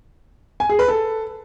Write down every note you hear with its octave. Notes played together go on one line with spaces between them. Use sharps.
G#5
G#4
B4
A4